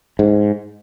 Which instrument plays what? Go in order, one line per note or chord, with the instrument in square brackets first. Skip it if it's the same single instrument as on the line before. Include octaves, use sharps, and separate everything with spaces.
[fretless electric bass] G#2